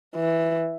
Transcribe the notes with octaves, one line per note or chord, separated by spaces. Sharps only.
E3